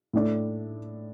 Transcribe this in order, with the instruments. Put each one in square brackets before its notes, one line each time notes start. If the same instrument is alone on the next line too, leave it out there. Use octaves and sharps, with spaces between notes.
[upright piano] A2 A3 D4